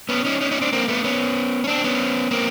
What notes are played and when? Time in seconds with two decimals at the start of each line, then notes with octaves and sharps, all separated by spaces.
0.09 B3 C#4
0.25 C#4 D#4
0.41 C#4 D#4
0.51 C#4 D#4
0.61 C4 D4
0.73 A#3 C4
0.88 A3 B3
1.04 B3 C#4
1.64 C#4
1.67 C4 D4
1.84 B3 C#4
2.31 A#3 C4